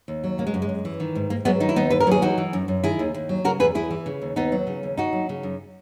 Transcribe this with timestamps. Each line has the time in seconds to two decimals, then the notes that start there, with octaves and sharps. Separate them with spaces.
0.08 D#2
0.24 F#3
0.38 C#3 A#3
0.47 G#3
0.54 F#2
0.62 G#3
0.69 F#2
0.85 E3
1.00 D#3
1.15 G#2
1.30 G#2 A#3
1.45 F#3 G#3 B3
1.60 D#3 D#4
1.69 E4
1.76 D#2 B3 D#4
1.90 D#2 B4
2.00 A#4
2.07 F#3 G#4
2.22 E3 D#4 F#4
2.38 E3
2.53 F#2
2.68 F#2
2.84 D#3 E4 G#4
2.99 D#2
3.14 D#2
3.29 F#3
3.44 C#3 F#4 A#4
3.60 E2 G#4 B4
3.75 E2 E4 G#4
3.91 E3
4.06 C#3
4.22 D#2
4.36 D#2 B3 D#4
4.52 F#3
4.67 C#3
4.83 D#2
4.97 D#2 D#4 F#4
5.13 F#3
5.29 C#3
5.43 F#2